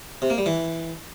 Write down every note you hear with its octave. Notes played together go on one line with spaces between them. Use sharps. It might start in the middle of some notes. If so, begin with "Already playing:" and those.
C3
A#3
G3
E3